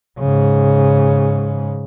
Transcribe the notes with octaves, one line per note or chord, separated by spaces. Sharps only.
G#2 C#3